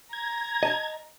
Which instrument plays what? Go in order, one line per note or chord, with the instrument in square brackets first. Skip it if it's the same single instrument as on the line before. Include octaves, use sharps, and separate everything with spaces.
[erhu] A#5 [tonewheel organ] G#6
[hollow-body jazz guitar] D#5 A5